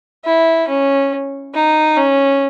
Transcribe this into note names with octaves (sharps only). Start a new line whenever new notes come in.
E4
C#4
D#4
C#4